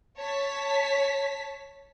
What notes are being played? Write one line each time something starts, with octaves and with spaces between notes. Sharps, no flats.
C#5 A5 B6